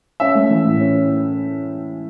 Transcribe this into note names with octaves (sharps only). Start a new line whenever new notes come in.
C#4 E5
A3
E3
A2
C#4